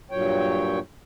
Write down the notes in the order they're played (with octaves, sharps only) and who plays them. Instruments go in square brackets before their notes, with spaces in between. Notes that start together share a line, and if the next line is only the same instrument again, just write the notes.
[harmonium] G2 A#2 F#3 C#5 G5